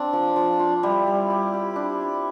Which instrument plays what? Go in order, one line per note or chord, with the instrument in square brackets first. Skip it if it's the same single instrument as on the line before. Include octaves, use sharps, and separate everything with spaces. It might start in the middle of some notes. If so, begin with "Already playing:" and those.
Already playing: [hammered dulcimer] C4 [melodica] D4
[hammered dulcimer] F3
F3
F4
[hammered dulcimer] G3 [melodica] E4
[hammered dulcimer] G3
G4
G4
D4